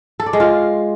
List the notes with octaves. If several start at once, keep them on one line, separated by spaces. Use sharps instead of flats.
A4
D5
G#3
F4